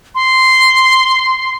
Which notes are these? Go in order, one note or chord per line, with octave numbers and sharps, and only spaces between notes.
C6